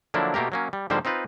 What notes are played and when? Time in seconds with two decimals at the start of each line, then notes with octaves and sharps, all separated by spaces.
0.14 D3 F3 F#3 A#3 D4 E4
0.34 B2 A3 A#3 G4 A#4
0.52 F#3 A#3 C#4
0.73 G3
0.90 G#2 D3 F3 G3 A#3 C5
1.05 C4 D#4 F4 B4